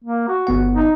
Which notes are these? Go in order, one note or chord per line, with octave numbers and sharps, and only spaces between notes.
A#3
F#4
G1 B3 F#5
D#4